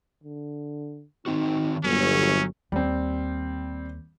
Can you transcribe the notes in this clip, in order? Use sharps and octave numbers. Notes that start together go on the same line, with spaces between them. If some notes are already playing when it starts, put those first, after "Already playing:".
D3
D#3 C4 D#4 F#4
G1 A#2 F#3 C#4
D#2 G3 C4